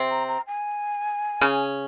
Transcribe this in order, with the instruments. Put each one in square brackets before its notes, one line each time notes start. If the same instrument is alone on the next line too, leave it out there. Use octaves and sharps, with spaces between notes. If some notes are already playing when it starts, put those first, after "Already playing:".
Already playing: [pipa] C3 C4
[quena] A#5
A#5
G#5
[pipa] C#3 C#4